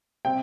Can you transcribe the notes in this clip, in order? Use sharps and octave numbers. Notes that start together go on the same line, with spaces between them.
C3 G3 C4 G5